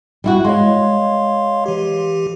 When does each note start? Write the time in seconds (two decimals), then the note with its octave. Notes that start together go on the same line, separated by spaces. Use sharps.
0.24 G3 E4 F#4
0.45 G#3 C#5 F5 C6
1.66 E3 G4